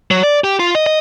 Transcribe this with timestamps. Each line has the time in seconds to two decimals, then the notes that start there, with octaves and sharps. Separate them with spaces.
0.11 F#3
0.23 D5
0.44 G4
0.59 F4
0.75 D#5
0.86 D#5